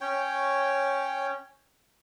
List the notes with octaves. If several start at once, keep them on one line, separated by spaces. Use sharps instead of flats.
C#4 C#5 G5